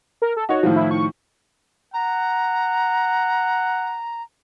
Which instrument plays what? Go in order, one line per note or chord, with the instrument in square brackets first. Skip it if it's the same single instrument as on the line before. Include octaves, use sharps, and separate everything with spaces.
[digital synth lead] A#4
A4
[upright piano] D#4 C#5 [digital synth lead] F#4
[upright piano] A2 D#3 F3
[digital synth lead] E4
C#6
[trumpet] F#5 [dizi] A#5